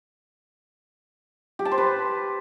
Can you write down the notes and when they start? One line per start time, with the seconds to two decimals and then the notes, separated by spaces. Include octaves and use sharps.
1.59 G4
1.65 A5
1.71 C5
1.78 B4